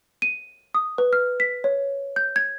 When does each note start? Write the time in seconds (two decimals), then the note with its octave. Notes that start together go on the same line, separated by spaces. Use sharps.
0.22 D#7
0.75 D#6
0.98 B4
1.13 F6
1.40 B6
1.64 C#5
2.16 G6
2.36 G#6